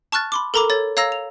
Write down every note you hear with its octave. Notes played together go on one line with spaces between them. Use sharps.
A5 C#6 F6 F#6 A6
B5 C6 D6
A4 A#4 A#5 B5 D6
A4 C#5 A6
C#5 F5 A#5 E6 A#6
F7